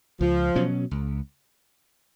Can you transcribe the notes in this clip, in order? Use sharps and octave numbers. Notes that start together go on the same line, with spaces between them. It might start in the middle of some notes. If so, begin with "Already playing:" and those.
C#2 F3
B2 F#3 C#4
C#2